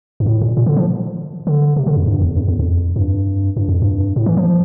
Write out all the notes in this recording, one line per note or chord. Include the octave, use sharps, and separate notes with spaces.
G2
A2
A#2
A#2
D3
F3
D3
C3
D3
F2
G2
E2
F2
E2
F2
G2
G2
F2
G2
A2
E3
F3